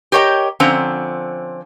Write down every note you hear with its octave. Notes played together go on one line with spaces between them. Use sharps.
G4 A#4 C#5 D#5 G5
D3 F3 C4 C#4 A#5